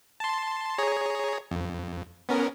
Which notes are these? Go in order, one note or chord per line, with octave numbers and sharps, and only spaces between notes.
A5 C6
G#4 C#5 A#5
F2
B3 C#4 A#4